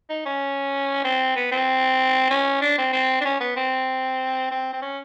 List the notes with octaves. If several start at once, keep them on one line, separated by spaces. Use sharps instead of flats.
D#4
C#4
C4
B3
C4
C#4
D4
C4
C4
D4
C#4
B3
C4
C4
C4
C#4